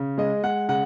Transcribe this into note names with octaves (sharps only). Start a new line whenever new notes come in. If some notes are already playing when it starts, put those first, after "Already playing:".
Already playing: C#3
G#3 D#5
G#3 F#5
C#3 F#5